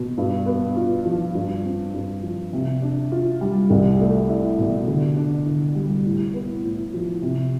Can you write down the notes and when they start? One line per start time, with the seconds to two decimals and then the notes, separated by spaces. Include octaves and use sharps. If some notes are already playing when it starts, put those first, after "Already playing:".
Already playing: B2
0.17 G2
0.46 B3
0.76 F4
1.05 F3
1.35 G2
1.64 C4
1.94 G2
2.23 F3
2.53 C3
2.82 D4
3.12 F4
3.41 G3
3.70 C2
3.99 A3
4.29 E4
4.59 B2
4.87 D3
5.16 D4
5.46 D3
5.75 G3
6.05 A2
6.34 B3
6.64 A2
6.94 F3
7.22 C3